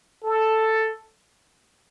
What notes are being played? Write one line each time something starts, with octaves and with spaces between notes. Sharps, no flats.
A4